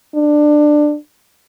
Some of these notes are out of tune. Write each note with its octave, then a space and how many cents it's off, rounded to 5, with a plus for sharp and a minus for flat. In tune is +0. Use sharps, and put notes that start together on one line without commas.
D4 +15